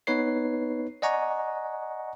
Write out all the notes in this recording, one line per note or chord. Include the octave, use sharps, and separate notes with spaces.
B3 D#4 B4 C#5 C7
D5 D#5 F#5 G#5 A#5 C#6